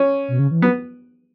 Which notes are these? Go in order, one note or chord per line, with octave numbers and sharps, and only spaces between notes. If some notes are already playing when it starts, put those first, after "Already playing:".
Already playing: C#4
B2
C#3
E3
F#3 B3